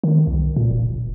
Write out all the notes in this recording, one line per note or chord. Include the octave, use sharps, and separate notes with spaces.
D#3
C2
A#2
E1